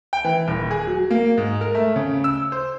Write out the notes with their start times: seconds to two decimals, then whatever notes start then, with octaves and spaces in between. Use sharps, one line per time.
0.13 G5
0.24 E3
0.48 D#1
0.71 G#4
0.87 F#3
1.10 A#3
1.37 G#2
1.61 A#4
1.75 A3
1.96 C#3
2.24 E6
2.52 C5